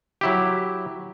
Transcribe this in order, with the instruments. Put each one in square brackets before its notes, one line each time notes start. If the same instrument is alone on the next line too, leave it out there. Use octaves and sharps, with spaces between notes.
[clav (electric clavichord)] F#3 E4 G4